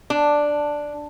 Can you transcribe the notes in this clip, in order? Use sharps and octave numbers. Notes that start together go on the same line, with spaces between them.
D4